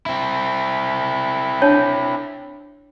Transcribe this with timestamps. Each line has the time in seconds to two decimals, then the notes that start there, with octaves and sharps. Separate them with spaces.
0.06 C4 E4
1.62 D4 C#5 A5